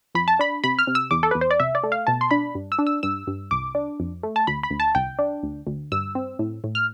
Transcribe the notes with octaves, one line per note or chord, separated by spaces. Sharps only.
F2 B5
A5
D4 B5
C3 B5
F6
C3
E6
E2 D6
A4
E2 B4
C5
D5
C2 E5
D5
A3
F5
B2 A5
C6
D4 B5
G2
E6
D4
E6
G2 E6
G2
C2 D6
D4
F2
A3
A5
D2 B5
B5
D2
A5
C2 G5
D4
D2
D2
G2 E6
C4
A2
A2
F6